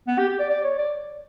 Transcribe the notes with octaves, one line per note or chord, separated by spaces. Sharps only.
B3
G4
G4
D5
D5
C#5
D5